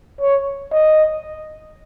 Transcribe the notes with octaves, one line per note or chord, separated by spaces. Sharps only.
C#5
D#5